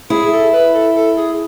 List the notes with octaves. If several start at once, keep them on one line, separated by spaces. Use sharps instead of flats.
E4 G#4
G#4
A4
B4
A4
A4
G#4